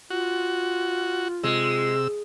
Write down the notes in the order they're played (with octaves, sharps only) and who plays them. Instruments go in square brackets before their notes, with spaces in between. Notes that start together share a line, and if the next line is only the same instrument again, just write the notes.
[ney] F4 [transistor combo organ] F#4
[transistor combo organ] C3 E6 [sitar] G#3